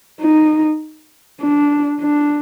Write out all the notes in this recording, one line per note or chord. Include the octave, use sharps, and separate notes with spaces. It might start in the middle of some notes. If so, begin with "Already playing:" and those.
D#4
D4
D4